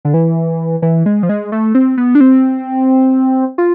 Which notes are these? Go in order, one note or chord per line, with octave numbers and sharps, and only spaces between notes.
D3
E3
E3
G#3
F3
G#3
A3
C4
B3
D4
C4
F4